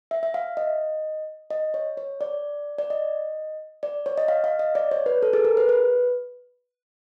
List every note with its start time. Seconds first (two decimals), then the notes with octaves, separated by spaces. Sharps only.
0.11 E5
0.23 E5
0.34 F5
0.57 D#5
1.51 D#5
1.74 C#5
1.97 C#5
2.21 D5
2.78 D5
2.90 D#5
3.83 D5
4.06 C#5
4.18 D#5
4.28 F5
4.44 F5
4.59 D#5
4.75 D5
4.91 C#5
5.06 B4
5.22 A4
5.33 G#4
5.45 A#4
5.57 B4
5.69 B4